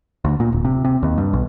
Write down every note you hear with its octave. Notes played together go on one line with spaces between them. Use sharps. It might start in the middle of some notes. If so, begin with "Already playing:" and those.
D2
A#2
D1
C3
C3
D#2
G2
B1